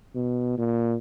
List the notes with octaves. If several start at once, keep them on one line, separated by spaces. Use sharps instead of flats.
B2
A#2